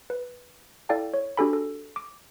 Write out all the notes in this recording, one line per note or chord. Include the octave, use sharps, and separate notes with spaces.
B4
E4 A4 D5 F5 G5 A5
C#5
D4 F#4 G4 A4 G#5 B5
A4
D6